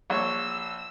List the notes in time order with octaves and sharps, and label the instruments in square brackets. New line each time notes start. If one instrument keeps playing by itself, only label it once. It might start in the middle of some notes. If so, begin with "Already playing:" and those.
[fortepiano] A#1 C#5 C#6 [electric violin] E6